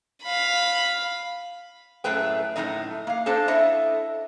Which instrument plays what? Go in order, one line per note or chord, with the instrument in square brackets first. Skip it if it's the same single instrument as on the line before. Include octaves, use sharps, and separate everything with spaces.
[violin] F5 B5
[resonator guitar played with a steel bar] F#2 A2 A3 G#4 B4 G5
F#2 A2 F3 D#4 D#5
A#3 F5
D4 A4 C5 D#5 A5
E4 A4 D#5 E5